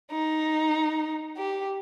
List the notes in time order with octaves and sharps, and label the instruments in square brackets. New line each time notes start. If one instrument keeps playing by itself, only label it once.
[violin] D#4
G4